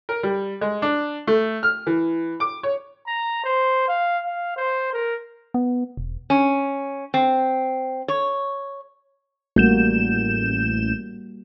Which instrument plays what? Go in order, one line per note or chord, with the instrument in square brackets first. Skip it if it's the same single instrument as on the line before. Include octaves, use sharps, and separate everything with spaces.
[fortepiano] A#4
G3
G#3
D4
A3
F6
E3
D6
C#5
[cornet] A#5
C5
F5
F5
C5
A#4
[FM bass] B3
E1
[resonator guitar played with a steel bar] C#4
C4
C#5
[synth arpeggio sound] A1 G6 E7 [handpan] G3 A#3 F#4